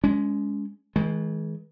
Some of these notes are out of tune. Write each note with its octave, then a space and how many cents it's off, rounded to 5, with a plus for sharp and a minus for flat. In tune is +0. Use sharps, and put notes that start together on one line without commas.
G#3 +0 C#4 +30
E3 -40 G#3 +20